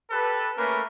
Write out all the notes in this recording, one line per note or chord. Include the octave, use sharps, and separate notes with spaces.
G4 A4 B4
A3 A#3 C#4 A#4 B4